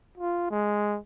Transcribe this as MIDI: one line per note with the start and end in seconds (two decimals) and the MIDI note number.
0.18 0.50 65
0.51 0.98 56